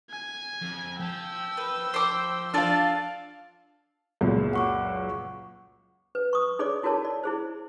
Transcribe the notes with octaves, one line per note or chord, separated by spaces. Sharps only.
G#5
F2
F3 G5 A5 E6
B4
C5 D6
D4 F4 A4 D5 F5
C#2 F#2 A#2
F#5 C#6 D6
B4
C#6 D#6
D#4 G#4 C#5 D5 D6
E4 F#4 G#4 A#4 C#5 A5
D5
E4 G#4 C5